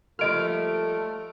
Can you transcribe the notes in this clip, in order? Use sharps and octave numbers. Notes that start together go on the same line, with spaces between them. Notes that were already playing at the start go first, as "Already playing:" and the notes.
F3 G3 A3 A#3 F#4 D#5 F6 D7